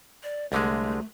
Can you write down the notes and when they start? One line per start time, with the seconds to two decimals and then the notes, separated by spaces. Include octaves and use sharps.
0.23 D5
0.52 C2 D3 G#3 A3